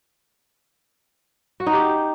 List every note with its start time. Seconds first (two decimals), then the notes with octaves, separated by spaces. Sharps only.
1.60 F#4
1.66 D#4
1.73 G4